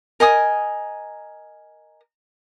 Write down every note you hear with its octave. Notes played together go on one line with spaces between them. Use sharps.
A#4 D#5 G#5 D#6